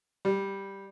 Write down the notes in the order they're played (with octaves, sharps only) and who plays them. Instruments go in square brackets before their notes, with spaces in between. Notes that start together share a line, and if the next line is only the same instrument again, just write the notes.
[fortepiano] G3